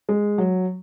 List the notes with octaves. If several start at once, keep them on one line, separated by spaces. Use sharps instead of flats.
G#3
F#3